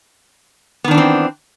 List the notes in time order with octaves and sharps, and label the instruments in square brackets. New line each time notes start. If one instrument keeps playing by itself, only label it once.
[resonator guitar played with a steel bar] B3
D#3
D4
E3
C4